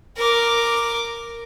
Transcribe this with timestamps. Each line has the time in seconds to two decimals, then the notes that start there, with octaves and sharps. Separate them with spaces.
0.17 A#4 D6